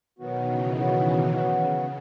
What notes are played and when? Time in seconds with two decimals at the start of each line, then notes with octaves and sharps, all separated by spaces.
0.18 B2 D#3 F#3 B3 F#4
0.48 C#3 E3
0.75 B2 D#3 F#3 B3 F#4
1.32 C#3 F#3 B3 F#4